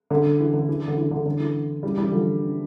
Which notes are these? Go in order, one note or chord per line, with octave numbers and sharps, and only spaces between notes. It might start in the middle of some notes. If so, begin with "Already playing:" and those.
D3
E3
D3
E3
D3
E3
D3
D3
E3
E3 G3
E3 G3
D3 F3